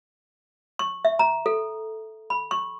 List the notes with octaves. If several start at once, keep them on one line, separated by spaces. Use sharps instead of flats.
C#6
E5
A#5
A4
B5
C#6